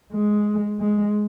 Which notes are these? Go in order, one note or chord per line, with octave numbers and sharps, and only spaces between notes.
G#3
G#3